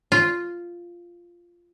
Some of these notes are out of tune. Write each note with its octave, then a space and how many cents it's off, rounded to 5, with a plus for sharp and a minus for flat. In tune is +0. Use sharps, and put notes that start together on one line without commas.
F4 -5